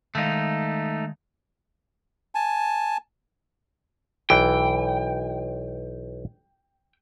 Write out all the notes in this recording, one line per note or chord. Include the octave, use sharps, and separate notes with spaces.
D#3 G#3 A3 D#4 F5
G#5 A5
B1 E3 G5